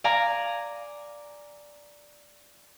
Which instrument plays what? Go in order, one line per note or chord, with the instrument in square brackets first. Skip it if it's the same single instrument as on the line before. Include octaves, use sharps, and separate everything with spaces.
[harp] D5 F5 G#5 A#5